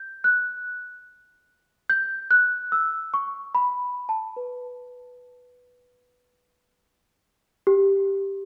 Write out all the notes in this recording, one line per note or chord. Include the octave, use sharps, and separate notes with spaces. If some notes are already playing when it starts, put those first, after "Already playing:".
Already playing: G6
F#6
G6
F#6
E6
C#6
B5
A5
B4
G4